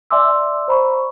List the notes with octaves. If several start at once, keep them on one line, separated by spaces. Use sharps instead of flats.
D5 E5 G#5 C6 D6 E6
C5 A#5 B5 C#6